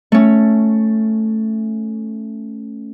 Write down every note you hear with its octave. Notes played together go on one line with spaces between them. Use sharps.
A3 C#4